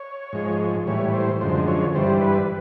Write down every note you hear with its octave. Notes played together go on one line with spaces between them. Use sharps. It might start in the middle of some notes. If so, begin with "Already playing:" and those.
Already playing: C#5
G#2 F3 G#3
A2 E3 G3 C#5
C5
F#2 D3 F3 G#3 C5
C#5
G2 E3 G3 C5
B4